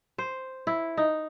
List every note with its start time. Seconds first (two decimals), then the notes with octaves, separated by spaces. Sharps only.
0.18 C5
0.67 E4
0.97 D#4